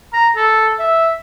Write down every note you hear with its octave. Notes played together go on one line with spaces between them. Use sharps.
A#5
A4
E5